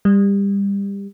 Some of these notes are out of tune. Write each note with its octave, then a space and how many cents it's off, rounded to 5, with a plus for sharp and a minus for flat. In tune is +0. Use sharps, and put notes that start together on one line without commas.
G3 +25